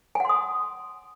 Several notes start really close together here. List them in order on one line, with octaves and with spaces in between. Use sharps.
G#5 F#5 C6 D#6